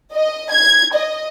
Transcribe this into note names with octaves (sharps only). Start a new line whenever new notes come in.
D#5
G#6
D#5